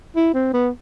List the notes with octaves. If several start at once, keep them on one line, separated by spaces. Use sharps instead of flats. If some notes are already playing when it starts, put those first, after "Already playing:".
E4
C4
B3